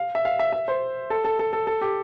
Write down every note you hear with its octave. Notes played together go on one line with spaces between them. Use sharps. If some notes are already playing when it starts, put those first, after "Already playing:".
Already playing: F5
E5
F5
E5
E5
C5
A4
A4
A4
A4
A4
G4